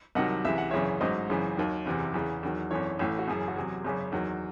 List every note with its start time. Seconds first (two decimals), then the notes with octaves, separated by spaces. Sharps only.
0.15 C2 C3 D#3 F#3 D#5 F#5
0.45 C#2 C3 E3 E5
0.58 F#5
0.70 G#1 F#2 C#3 E3 C#5 E5
1.01 A1 G#2 F#3 C5 D#5
1.29 G#1 F#2 C#3 E3
1.57 D#2 D#3 F#3
1.86 F#1 E2 C3 E3
2.14 E2 C#3 E3
2.43 E2 D#3 F#3
2.71 G#1 F#2 E3 A4 C#5
2.99 A1 A2 E3
3.19 F#4
3.28 F#1 F#2 E3 G#4
3.48 F#4
3.56 E2 C3 F#3 G#4
3.84 G#1 F#2 C#3
4.12 E2 D#3 F#3